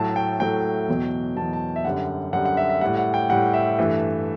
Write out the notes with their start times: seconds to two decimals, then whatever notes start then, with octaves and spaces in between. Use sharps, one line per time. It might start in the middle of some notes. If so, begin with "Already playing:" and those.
Already playing: A2 F#3 A3 A5
0.16 G5
0.40 A2 F#3 A3 G5
0.88 E2 B2 F#3
1.36 E2 B2 F#3 A5
1.53 A5
1.76 E5
1.85 F#2 D3 G3 F#5
2.33 F#2 D3 G3 F#5
2.45 F#5
2.57 E5
2.69 E5
2.81 A2 G3 F#5
2.97 F#5
3.14 G5
3.29 A2 G3 F#5
3.54 E5
3.78 G2 E3 A3